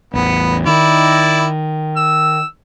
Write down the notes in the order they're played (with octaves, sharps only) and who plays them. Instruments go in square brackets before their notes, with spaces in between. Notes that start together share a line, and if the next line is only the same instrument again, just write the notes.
[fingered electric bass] A1 E2 [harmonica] B3
[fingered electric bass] D#3 [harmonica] E4 D5
[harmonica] E6